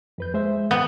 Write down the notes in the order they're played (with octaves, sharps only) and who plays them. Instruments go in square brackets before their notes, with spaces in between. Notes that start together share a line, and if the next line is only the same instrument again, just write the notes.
[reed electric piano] F2 B4 G6
G#3 C5 E5
[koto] B3 [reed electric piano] F#5 G5